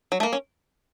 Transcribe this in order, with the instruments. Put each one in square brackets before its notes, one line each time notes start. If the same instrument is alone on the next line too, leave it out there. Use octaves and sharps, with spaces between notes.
[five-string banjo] F#3
A3
A#3
C#4